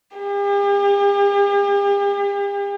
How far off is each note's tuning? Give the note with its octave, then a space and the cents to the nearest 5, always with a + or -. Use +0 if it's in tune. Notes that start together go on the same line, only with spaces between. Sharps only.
G4 +45